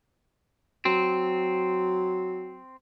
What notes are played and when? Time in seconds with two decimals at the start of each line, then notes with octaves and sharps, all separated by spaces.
0.85 F#3 C4